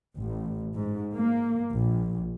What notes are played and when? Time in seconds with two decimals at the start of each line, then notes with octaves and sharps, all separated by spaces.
0.18 A1
0.76 G#2
1.16 A#3
1.74 A#1